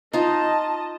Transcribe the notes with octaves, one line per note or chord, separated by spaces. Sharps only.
D#4 F4 D#5 A5